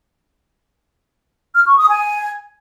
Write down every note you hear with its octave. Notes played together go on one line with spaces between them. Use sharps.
F6
C#6
D#6
G#5